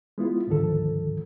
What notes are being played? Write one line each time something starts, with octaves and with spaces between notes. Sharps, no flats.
G#3 B3 E4 F4
D2 G#2 D3 D#3 F3 A4